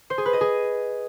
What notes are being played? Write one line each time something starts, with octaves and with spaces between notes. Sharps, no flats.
C5
G#4
B4
D#5
G#4